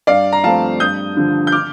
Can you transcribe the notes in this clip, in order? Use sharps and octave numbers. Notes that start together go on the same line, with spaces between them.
G2 D5 F5
A#5
F3 A3 C4 F5 A5
G2 D#6 G6
D3 F3
G6
D6 F6